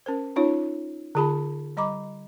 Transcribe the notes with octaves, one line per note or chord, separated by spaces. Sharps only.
C#4 A#4 C5
C#4 D#4 F4 C#5
D3 F4 G#4 A5 B5
G3 D#5 A#5 B5 D6